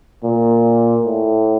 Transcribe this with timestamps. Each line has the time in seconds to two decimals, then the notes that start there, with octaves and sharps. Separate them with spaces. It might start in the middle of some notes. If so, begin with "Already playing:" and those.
0.24 A#2
1.05 A2